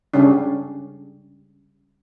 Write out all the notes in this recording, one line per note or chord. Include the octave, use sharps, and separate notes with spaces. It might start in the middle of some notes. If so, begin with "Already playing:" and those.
C#3 G3 C#4 D4